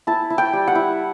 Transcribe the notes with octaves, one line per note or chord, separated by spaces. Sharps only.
E4 A5
E4
G5
G3
F#5
E4